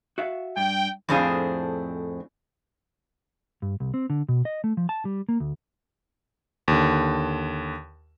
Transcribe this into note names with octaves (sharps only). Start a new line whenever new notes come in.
F#4 E5 F5
G2 G5
F2 A2 C4 D4 G#4 F5
G2
C2
C4
D3
B2
D#5
A3
F3
A5
G3
A#3
D2
D#2 D3